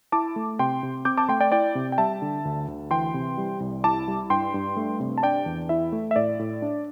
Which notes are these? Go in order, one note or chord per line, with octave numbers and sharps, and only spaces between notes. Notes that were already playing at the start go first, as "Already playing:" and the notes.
E4 A5 D6
A3
C3 G5 C6
C3
C4 D6 G6
A5 D6
A3 G5 C6
D5 G5
E4 D5 G5
C3
G5
G3 E5 A5
D3
D2
D2
E3 G5 C6
C3
G3
C2
E4 A5 D6
G3
G2 G5 C6
G2
A3
C3
A5
D4 D5 G5
E2
E4 E5
A3
E5
A2 D5
A2
D4